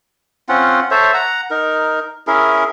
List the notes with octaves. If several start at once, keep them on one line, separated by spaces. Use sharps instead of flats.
C4 C#4 F4 F#5
A4 C5 C#5 E5
F#5 A#5
D#4 A#4
C#4 E4 G#4 A#4